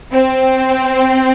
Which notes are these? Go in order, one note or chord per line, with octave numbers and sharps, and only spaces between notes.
C4